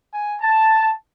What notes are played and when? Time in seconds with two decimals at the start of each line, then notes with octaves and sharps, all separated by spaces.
0.12 G#5
0.40 A5